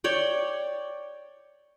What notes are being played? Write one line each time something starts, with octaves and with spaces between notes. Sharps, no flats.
C#5 D5 G5